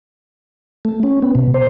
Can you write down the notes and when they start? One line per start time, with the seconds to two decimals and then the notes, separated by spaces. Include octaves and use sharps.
0.85 A3
1.03 C#4
1.22 B3
1.35 B2
1.54 C5